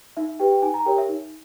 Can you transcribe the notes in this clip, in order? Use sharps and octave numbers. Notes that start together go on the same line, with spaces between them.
D#4 E5
E5
G4 B4 G5
G5
D#4 G#5
A#5
G4 A#4 C#5 G5
E5
D#4